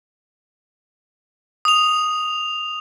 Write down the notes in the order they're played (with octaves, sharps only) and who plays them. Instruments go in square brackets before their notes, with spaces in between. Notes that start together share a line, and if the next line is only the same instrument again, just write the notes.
[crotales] D#6 F7